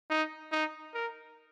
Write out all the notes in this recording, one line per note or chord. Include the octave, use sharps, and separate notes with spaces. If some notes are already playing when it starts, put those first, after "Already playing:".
D#4
D#4
A#4